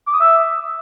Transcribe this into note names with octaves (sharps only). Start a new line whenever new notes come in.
D6
D#6
E5